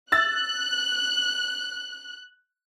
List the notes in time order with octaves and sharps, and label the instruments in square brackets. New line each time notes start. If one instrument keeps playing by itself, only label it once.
[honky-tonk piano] E6 A6 [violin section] F#6